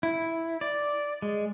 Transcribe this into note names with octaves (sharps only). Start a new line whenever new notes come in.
E4
D5
G#3